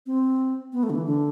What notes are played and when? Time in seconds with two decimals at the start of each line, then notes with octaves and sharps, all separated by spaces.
0.06 C4
0.73 B3
0.83 A3
0.90 D3
0.95 E3
1.06 D3